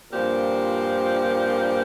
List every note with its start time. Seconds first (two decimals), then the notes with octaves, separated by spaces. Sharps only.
0.12 G2 A#2 F3 C4 G4 A#4